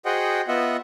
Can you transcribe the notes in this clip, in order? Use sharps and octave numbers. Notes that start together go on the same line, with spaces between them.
F#4 G#4 C5 D#5 F#5 G5
B3 F4 D#5 E5 F#5